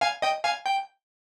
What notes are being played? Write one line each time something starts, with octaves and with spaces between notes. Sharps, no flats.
F5 G#5
D#5 G5
F5 G#5
G5